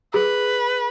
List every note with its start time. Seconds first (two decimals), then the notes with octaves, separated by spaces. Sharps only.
0.14 G#4 B4